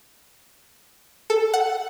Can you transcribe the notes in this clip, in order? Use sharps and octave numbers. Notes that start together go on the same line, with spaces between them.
A4
F#5